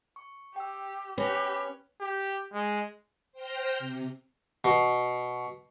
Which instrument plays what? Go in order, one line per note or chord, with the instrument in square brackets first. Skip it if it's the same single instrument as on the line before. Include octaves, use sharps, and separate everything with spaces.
[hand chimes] C#6
[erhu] G4 [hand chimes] G5 E6
[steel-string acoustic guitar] C#4 [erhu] G4 [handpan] B4 [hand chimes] B5 A#6 B6
[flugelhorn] G4
G#3
[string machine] C5 G5 F6 A#6
C3
[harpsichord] B2